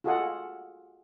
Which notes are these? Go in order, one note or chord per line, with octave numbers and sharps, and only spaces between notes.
F4 F#4 G#4 A4 D#5 F#5